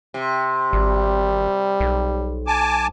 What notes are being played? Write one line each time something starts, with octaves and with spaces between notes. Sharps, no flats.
C3
G#1 G3
B1
G#5 A5 D6